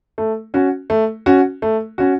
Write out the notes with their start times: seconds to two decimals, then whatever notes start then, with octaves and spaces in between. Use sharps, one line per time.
0.18 A3
0.54 C#4 F#4
0.90 A3
1.26 C#4 F#4
1.62 A3
1.98 C#4 F#4